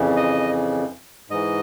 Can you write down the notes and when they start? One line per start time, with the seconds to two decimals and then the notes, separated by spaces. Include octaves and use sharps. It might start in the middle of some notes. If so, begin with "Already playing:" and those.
Already playing: F2 C#3 E3
0.17 D#5
1.30 G#2 E3 D#5